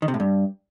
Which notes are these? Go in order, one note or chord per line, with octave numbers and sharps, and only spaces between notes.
D#3
C3
A2
G2